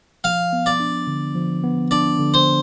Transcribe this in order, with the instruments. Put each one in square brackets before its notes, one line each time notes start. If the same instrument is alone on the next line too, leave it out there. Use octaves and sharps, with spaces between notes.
[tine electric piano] F3 [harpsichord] F5
[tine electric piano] B3
[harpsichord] D5
[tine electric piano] D4
D3
F3
B3
[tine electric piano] D4 [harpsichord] D5
[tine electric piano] D3
[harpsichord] C5